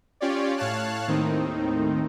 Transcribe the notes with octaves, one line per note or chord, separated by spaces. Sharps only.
C#4 F4 G4 C#5 D5
A2 C#5 F5 A5 F#6
D#2 A2 D#3 C4 D#4